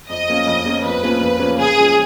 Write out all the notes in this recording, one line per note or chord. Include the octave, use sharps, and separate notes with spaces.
F2 D#5
F3 A#3 C#4 F4
F2
F3 A#3 C#4 F4
F2 B4
F3 A#3 C#4 F4
F2
F3 A#3 C#4 F4
C#3 G#4
F3 G#3 C#4